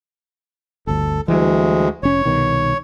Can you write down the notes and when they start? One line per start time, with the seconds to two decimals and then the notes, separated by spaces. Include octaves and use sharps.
0.87 G1 D2 A4
1.28 D2 E3 G3 G#3
2.03 F1 C#4 C#5
2.26 C2 B2 D#3